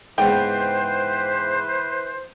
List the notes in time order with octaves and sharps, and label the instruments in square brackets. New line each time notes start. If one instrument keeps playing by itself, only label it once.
[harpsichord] G#2 C#3 B3 [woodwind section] E3 B4 C5 [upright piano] G5